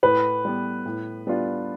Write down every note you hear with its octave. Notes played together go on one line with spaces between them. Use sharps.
A2 B4
G3 B3
A2
G3 B3 D4 F4